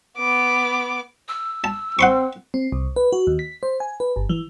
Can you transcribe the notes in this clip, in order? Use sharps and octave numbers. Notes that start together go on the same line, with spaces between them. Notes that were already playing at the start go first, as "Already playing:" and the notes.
B3 D6
E6
A5
C4 F#5 C6 C#6
C4
C2
B4
F#4
D#2
B6
C5
G#5
B4
G1
E3